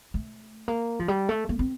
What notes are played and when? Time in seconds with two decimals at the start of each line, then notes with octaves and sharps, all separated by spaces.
0.14 A3
0.68 A#3
0.99 F3
1.08 G3
1.29 A3
1.49 A#3
1.59 C4